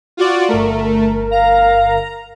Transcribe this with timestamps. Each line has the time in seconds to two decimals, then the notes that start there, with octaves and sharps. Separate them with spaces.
0.17 F4 F#4 D5
0.48 G1 A3 A#4
1.31 F5 A#5